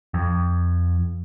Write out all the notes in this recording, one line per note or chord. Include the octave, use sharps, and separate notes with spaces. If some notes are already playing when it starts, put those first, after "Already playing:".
F2